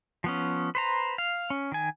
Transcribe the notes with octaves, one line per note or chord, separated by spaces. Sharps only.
F3 B3 C#4
B4 C5 A#5
F5
C#4
D#3 G#5